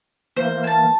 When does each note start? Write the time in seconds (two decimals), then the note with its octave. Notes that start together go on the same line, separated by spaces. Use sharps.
0.37 E3 A#3 C5
0.64 G#5 A5